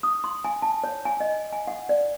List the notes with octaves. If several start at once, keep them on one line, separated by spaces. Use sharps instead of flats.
D#6
C6
G#5
A5
C#5
G#5
D#5
G#5
F#5
D5